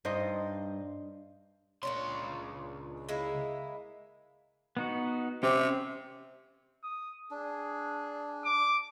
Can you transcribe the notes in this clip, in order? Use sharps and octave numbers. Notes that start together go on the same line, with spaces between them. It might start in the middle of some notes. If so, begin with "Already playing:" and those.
G2 D#4 C5 D#5
C#2 A#2 D4 C#5 C6
G#3 A#3 E4
B3 D#4 F#4
C3 C#4 G4 D6
D#6
D4 G#4
D6